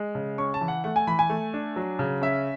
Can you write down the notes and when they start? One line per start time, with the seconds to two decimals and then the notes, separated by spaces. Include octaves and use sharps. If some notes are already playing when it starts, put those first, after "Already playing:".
Already playing: G#3
0.15 C#3
0.38 C#4 C#6
0.54 A5
0.61 E3
0.68 F#5
0.84 A3 F#5
0.96 G#5
1.07 E3 B5
1.19 G#5
1.30 A3
1.54 D4
1.76 F#3
1.99 C#3
2.22 C#4 E5